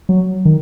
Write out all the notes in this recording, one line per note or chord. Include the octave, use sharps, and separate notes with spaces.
F#3
D#3